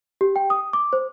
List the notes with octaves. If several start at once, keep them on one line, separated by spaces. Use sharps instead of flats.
G4
G5
D#6
D6
C5